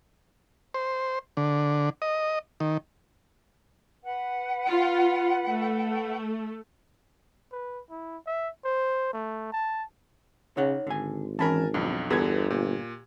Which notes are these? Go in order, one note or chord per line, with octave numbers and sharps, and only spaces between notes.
C5
D3
D#5
D#3
B4 F#5
F4
A3
B4
E4
E5
C5
A3
A5
C#3 D#4 C#5 F#5
G#1 D3 G#5
E3 C#4 A#4 G#5 A5 B5
B1 F2 D4
G1 E2 D3 G4 G#4 B4 G#6
A#2 G4